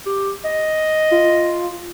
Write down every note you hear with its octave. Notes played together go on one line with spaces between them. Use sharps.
G4
D#5
F4